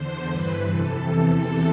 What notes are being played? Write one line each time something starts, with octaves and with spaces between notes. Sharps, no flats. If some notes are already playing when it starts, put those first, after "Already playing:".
Already playing: E2 D3 C5
G2 E3 B4
F2 C3 E3 A4
E2 C3 E3